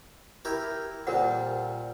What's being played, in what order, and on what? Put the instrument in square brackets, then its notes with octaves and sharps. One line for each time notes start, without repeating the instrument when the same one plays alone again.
[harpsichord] E4 G4 A#4
[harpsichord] A#2 G3 [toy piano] A#4 C5 F#5